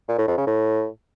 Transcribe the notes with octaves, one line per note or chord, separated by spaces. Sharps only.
A#2
A2
F2
C#3
A2